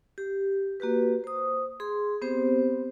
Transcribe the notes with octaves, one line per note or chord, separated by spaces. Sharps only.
G4
A#3 F#4 G4 B4
C5 D#6
G#4 C6
B3 C4 G4 C5